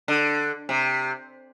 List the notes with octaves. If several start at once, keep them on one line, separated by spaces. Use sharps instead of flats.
D3
C3